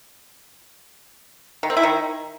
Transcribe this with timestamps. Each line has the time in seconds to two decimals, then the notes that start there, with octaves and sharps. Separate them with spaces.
1.63 D#3
1.70 C4
1.77 E4
1.83 D#3